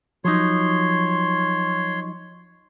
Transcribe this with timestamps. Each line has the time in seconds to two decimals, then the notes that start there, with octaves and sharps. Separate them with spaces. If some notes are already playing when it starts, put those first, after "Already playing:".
0.25 F3 F#3 D#4 C#5 C6